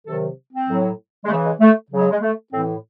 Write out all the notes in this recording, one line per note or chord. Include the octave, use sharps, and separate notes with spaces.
C3 D#3 F#3 A4
C4
A2 F#3
G#3
C#3 E3 A3
G#3
A3
C#3 F#3
G#3
G#3
A3
A2 E3 C4